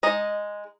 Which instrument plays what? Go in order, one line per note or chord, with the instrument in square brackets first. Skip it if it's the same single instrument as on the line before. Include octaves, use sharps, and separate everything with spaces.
[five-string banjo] G#3 D#4 D#5